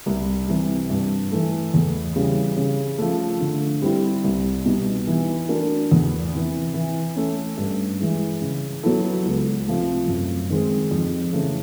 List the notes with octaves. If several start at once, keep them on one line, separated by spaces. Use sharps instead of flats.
C2
C3 E3 G3
G2
E3 A3
E2
C#3 E3 G3
C#3
F3 A3
D3
G3 C4 E4 G4
C2
B2 G3 B3 D#4
E3
A3 D4 F#4 A#4
E2
C3 E3
E3
A3 C#4
G2
E3 G#3
C#3
F#3 B3 E4 A4
C#2
C3 F3 A3
F#2
D#3 G#3 C4
F2
C#3 E3 A3